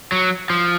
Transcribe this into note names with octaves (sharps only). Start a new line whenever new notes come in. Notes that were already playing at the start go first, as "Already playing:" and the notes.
F#3
F3